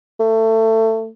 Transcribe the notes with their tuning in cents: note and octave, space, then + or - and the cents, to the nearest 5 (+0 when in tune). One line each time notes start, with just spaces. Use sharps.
A3 +20